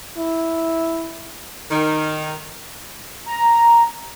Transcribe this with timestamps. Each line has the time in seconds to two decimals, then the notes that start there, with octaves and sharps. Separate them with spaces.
0.18 E4
1.70 D#3
3.26 A#5